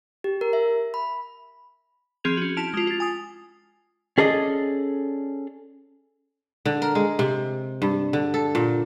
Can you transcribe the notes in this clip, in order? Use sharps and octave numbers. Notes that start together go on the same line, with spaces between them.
G4
A#4
E5
B5
F3 C4 G#4 G#6 F7
C#4 F#4
E4 A5 F6 D7 F7
G#3 F4
F4 A6
G#5 D#6
C#4 G#4 A4 D5 D#5
D3
A#4
G#3
C3
G2
D3
A4
A#2